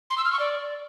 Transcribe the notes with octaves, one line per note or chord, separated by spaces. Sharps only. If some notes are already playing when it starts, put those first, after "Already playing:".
C6
E6
F6
C#6
D5